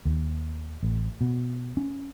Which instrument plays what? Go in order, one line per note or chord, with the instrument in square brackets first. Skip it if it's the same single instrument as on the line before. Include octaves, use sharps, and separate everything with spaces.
[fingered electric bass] D#2
A1
B2
C#4